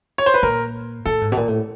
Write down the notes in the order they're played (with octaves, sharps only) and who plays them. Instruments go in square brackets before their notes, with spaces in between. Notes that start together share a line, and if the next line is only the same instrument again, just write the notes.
[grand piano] C#5
C5
B4
[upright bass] A#2 [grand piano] A#4
[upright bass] A2 [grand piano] A4
[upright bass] G#2
B2
A#2
A2